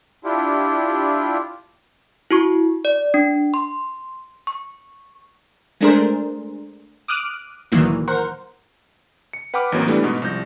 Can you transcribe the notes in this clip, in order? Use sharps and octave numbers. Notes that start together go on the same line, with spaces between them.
D4 E4 F4 G4
E4 F#4 C#6
D5
D4
C6
C#6
G#3 A3 D4 G#4 A#4 C5
D6 D#6 F6 F#6 D7 D#7
D2 A#2 D#3 E3 F#3 A#3
A#4 C5 F#5
C#7
B4 F#5 G5 B5 D6 F6
A1 E2 F#3 A#3 C4
E3 G3 A3 B3 D4
G#2 B2 G#3 B3
C2 F3 G6 A#6